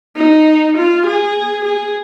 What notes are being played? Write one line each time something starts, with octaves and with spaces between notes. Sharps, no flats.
D#4
F4
G#4
G#4